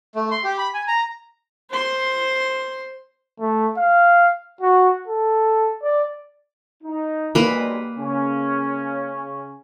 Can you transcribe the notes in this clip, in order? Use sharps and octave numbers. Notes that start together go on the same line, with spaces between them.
A3
C6
G4
B5
G#5
A#5
C5 C6
A3
F5
F#4
A4
D5
D#4
B1 G3 G#3 A#3 B4
C#3 C#4